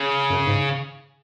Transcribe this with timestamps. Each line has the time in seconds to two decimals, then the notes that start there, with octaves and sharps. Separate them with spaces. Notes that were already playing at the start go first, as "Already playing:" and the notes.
Already playing: C#3
0.30 F#2
0.47 G#2